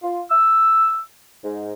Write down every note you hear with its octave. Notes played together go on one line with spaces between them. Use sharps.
F4
E6
G#2